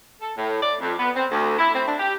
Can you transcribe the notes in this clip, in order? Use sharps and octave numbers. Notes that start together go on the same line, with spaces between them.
A4
A2
D5
F2
B3
C4
D2
E4
C4
D4
G4